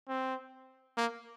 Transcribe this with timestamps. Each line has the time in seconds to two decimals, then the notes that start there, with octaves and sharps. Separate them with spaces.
0.08 C4
0.97 A#3